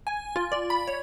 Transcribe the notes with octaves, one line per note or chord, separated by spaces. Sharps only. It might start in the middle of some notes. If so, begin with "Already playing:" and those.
G#5
F4
D5
B5
C#5